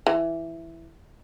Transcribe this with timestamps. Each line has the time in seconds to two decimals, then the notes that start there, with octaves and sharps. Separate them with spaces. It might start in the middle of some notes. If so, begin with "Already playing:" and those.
0.07 E3